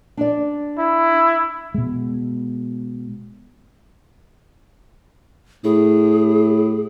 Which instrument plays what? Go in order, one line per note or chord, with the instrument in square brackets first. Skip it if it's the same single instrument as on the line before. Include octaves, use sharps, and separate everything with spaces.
[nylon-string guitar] D4 D5
[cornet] E4
[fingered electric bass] B2 G#3
[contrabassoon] A2 [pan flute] G#4